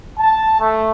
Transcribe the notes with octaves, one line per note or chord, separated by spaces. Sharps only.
A5
A3